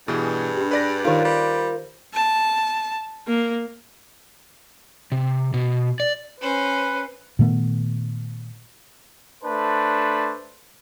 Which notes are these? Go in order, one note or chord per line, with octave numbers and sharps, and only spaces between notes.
G2 B2 E3 G#4
D4 G4
B4 D5 A#6
D#3 D#4 F4 A#4 C5
G3
A5
A#3
C3
B2
D5
C#4 B4 C5
A#2 D#3 A3 B3
A3 D4 B4 C5 A5